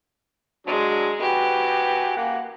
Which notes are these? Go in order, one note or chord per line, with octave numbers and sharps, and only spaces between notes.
F#3 G#3 D4
F#4 G4 B4 G#5
A#3 F#5